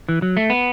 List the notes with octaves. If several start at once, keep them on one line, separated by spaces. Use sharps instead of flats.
E3
F#3
A3
B3